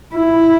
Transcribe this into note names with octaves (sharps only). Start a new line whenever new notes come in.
E4